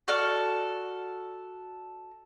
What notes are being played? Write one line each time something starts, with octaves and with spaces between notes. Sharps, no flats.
F#4 A4 D5 F6